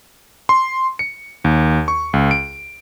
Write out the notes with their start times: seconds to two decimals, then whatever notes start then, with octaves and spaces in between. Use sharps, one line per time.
0.49 C6
0.99 C#7
1.44 D#2
1.88 C#6
2.13 C#2
2.31 D7